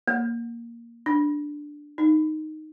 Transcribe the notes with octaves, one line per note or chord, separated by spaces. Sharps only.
A#3
D4
D#4